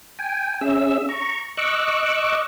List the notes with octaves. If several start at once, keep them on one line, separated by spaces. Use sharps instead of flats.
G5 G#5
C#4 G#4 E5 E6
A#5 C#6
D#5 C#6 D6 E6 F#6